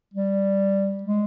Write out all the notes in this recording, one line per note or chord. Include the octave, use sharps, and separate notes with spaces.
G3
G#3